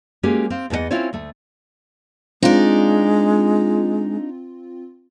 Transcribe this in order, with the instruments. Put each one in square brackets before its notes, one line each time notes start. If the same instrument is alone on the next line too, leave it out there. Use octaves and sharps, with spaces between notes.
[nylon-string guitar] G#3 A#3 C#4 F#4 G4
C4 F5
E2 E3 B3 A4 D#5 F#5
C4 C#4 E4 F4 C5 C#5
D2 A3
[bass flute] G#3 [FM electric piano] C4 F4 [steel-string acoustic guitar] D4 D#4